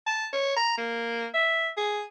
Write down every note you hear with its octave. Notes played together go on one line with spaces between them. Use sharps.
A5
C#5
A#5
A#3
E5
G#4